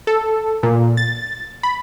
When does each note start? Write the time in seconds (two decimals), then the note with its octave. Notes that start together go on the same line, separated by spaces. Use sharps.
0.07 A4
0.63 A#2
0.97 A6
1.63 B5